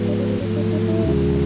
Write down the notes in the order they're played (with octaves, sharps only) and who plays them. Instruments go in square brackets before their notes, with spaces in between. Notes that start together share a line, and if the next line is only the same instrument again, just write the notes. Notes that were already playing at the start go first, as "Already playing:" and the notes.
Already playing: [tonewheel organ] G#2 F3 G#3 B3
D4
C#4
C4
G#2 F3 A3 C#4
D4
D#4
E4
D#2 C#3 F3 G#3